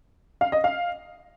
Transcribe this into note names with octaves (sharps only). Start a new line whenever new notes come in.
F5
D#5
F5